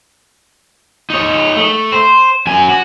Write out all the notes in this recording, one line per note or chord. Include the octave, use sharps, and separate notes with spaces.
D#4 C#5
A3
C5
F#2 G#5
F#4